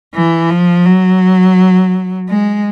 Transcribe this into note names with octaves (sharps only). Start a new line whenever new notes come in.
E3
F3
F#3
G#3